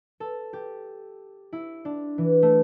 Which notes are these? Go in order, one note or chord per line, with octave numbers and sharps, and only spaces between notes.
A4
G4
E4
D4
E3
A3